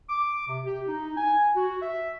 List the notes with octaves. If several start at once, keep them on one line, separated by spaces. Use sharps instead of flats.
D6
C3
G4
D#4
G#5
F#4
E5